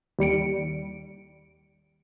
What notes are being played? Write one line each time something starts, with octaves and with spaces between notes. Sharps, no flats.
D#2 G3 C#7 D7